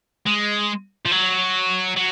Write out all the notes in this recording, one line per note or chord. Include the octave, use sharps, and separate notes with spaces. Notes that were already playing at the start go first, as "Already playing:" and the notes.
G#3
F3
F#3
F#3